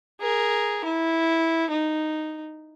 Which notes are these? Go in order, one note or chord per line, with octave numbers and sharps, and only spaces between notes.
G#4 A#4
E4
D#4